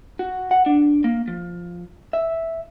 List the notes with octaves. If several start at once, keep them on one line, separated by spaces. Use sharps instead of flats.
F#4
F#5
D4
A#3
F3
E5